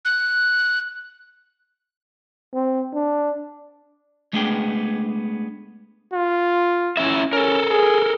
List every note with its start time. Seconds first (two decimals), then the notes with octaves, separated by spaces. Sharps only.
0.05 F#6
2.54 C4
2.94 D4
4.33 G#3 A3 B3 D4 G#4 G5
6.13 F4
6.97 C#4 E4 E5
7.33 C#4 A4 A#4
7.71 G#4